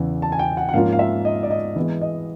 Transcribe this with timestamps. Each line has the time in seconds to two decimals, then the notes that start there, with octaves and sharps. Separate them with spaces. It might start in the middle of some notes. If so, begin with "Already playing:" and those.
Already playing: E2 C#3 E3
0.22 A5
0.32 G#5
0.39 G5
0.57 F#5
0.69 F#5
0.73 G#2 F3 A#3 C#4 F4 F5
0.93 F5
0.99 E5
1.25 D#5
1.43 D5
1.50 D#5
1.76 E3 G#3 B3
2.01 D#5